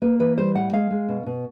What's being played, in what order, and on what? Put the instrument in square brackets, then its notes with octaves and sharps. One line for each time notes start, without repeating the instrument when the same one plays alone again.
[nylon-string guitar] A#3 B4
E3 B4
G3 C5
A2 F#5
G#3 F5
G#3
B2
B2